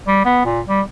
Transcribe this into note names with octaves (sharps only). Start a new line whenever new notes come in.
G3
B3
A#2
G3